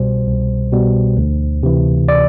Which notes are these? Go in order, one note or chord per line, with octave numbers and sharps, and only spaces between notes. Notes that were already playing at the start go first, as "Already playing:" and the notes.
Already playing: C2 B2 G3 C5
C2
B2 G3
D2
C3 E3
D5